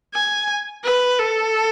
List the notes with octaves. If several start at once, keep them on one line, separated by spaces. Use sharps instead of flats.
G#5
B4
A4